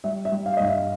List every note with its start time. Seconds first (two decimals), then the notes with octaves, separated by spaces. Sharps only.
0.04 G3 E5
0.25 E5
0.32 G3
0.46 F5
0.57 G2 D#5
0.67 E5